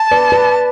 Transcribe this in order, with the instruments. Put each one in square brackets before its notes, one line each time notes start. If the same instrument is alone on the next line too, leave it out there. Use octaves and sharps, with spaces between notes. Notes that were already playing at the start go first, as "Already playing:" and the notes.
Already playing: [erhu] A5
[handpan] B4 D5
B4 D5